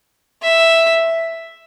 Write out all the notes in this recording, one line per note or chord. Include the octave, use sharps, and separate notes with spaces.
E5